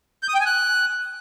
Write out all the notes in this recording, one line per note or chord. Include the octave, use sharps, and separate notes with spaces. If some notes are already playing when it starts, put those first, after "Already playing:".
G6
D#6
G5
G#5
F#6